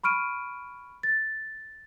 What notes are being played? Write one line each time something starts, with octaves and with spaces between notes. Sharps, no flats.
B5 C#6 F6 D7 D#7
A6